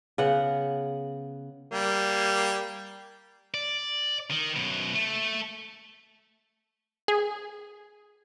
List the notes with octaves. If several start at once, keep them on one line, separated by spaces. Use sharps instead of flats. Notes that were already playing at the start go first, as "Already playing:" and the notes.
C#3 B3 F#5
G3 A#3
D5
D#3
F#2 B2
A3
G#4